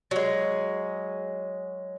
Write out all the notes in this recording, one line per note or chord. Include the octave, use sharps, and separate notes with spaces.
F#3 G#3